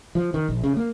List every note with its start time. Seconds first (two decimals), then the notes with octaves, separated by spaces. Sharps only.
0.15 F3
0.34 D#3
0.49 A#1
0.63 C#3
0.77 A#3